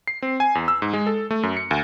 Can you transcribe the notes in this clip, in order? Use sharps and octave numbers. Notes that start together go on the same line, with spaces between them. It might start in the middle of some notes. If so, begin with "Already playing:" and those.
C7
C4
G#5
E2
E6
G#2
G#3
A4
A3
F#2
C#7
D2